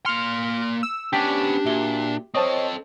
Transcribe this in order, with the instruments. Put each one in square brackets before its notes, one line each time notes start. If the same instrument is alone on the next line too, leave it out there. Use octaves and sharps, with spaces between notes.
[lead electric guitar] A#3 C6 [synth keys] F6 [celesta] C#7 F7
[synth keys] E6
[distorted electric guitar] B3 C#4 [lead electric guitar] D4 [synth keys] G4 [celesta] B6 D7
[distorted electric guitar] A#2 [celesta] F#4 E5 G7
[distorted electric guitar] C4 A4 [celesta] C5 C#5 C#6 [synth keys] D#5 A5